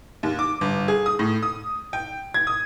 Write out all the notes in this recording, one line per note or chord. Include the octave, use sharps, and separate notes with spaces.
D#2
D6
G1
G#4
D#6
A2
D#6
G5
G#6
D#6